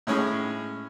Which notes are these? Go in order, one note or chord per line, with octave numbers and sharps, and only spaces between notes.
A2 G#3 C#4 G#4 B5